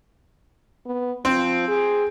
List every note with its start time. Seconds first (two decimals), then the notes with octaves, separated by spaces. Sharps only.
0.86 B3
1.25 F3 C4
1.68 G#4